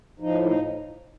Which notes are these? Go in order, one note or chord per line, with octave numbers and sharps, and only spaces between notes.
A2 F3 D#4
D#4